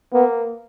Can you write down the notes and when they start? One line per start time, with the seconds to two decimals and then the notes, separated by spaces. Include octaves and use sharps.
0.13 A#3 B3